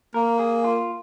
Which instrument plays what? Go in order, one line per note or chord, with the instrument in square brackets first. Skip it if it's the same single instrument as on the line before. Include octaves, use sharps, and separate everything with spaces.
[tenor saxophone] A#3 [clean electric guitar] A#4
[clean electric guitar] G#4
F4